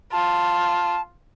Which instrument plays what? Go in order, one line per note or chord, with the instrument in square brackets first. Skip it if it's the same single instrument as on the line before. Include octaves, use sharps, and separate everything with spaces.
[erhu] F4 [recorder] A5